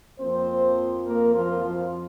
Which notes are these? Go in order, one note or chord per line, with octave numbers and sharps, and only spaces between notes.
F2 F3 A#3 C4 C5
A#3 A#4
F3 F4
F3 F4